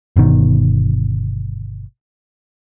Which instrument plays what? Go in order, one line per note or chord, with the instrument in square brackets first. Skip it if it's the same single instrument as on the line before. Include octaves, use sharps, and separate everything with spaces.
[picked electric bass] G1 B2 D#3